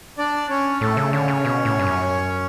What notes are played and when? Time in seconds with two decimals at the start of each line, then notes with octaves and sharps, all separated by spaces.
0.18 D4 D5
0.50 C#4 C#5
0.81 A2 A3 A4
0.97 C#3
1.13 D3 C#4 C#5
1.28 C#3
1.45 B2
1.65 A2
1.79 G2
1.86 F#2